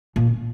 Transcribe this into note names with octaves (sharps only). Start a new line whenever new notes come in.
A#2